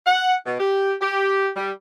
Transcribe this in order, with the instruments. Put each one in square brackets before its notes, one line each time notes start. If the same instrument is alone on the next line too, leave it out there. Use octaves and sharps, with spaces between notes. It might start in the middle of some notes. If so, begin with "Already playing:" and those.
[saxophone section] F#5
B2
G4
G4
G3